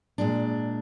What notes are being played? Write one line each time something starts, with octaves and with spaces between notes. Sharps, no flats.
A#2 G#3 D4